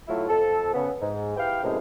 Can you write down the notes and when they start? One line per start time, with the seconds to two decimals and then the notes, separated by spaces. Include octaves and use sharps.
0.08 F#3 A3 E4 F4
0.29 F2 A4
0.74 C#3 B3
1.01 G#2
1.37 E4 G4 B4 F5 G5
1.63 F#2 A2 C3 G#3